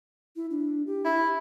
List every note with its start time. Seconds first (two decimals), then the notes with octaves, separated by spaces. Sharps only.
0.36 E4
0.51 D4
0.87 G4
1.05 E4